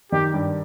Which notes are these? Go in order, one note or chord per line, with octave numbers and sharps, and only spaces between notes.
D#3 G4
G2